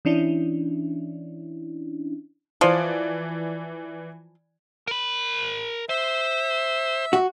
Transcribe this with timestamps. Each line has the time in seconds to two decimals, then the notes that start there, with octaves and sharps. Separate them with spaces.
0.05 E3 C#4 D4 E4
2.61 E3 F3 D5
4.87 A#4 B5
5.89 C5 E5
7.13 F#4